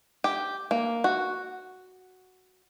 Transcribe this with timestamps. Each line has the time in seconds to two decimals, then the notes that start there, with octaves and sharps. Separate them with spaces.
0.24 G4
0.71 A#3
1.04 F#4